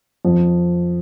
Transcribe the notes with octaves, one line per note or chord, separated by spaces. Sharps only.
F2